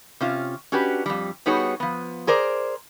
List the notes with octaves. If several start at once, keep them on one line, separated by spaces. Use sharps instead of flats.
C3 C#4 F4
C#4 D4 F#4 G4 B4
F2 G3
G3 B3 D#4 F#4 G#4 C#5
F3 B3
G#4 A#4 C5 D5